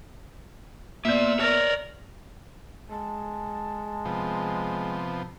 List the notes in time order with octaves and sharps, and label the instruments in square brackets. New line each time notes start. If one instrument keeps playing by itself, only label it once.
[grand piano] A#2 B3 G6 [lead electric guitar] A#3 D5 [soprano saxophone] E5
[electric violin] A#4 [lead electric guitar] C#5 D5
[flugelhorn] G#3 [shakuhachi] A5
[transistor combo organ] C3 F3 B3